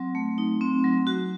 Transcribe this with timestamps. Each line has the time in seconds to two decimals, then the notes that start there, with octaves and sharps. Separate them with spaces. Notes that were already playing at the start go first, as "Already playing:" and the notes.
Already playing: F#3 C4
0.15 A3
0.38 D#4
0.61 C4
0.84 F#3
1.07 F#4